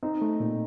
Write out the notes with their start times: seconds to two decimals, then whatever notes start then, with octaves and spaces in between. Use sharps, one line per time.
0.03 C4 D#4
0.22 A3
0.40 A#2